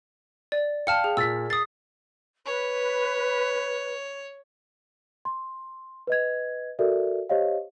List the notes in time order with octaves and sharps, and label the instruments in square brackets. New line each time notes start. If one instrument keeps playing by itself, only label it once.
[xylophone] D5
[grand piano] F5 G5 [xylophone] A5 F6 C#7
[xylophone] G#4
[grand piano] A#2 B6 [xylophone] E6 A6
[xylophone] D#6 A6 [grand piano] C7
[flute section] B4 [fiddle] C#5
[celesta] C6
B4 D#5 G#6
F#4 A4 A#4 D5 E5
G4 C5 C#5 D#5 F5